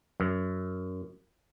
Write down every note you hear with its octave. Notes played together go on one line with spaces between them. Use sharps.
F#2